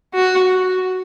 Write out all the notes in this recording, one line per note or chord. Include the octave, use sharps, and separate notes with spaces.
F#4